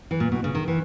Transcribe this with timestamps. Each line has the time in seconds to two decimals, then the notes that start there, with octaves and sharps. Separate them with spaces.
0.11 E3
0.20 A#2
0.32 B2
0.44 C#3
0.55 D#3
0.68 E3